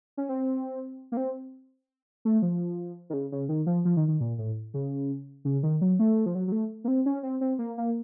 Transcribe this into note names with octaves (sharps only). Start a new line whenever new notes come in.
C#4
C4
A#3
C4
A3
F3
D#3
C#3
C#3
D#3
F3
F3
D#3
D#3
A#2
A2
C#3
C#3
D#3
F#3
A3
F3
F#3
F#3
A3
A#3
C4
C#4
C4
C4
A#3
A#3